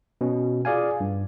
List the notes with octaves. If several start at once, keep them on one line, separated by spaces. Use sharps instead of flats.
B2 C#4
F4 G#4 D5 F5 G#5
G2